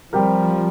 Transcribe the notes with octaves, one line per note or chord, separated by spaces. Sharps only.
F3 G3 C4 G4 A#4